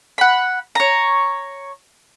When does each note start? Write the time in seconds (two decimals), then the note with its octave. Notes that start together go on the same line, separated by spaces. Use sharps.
0.18 F#5 B5
0.75 C#5 A#5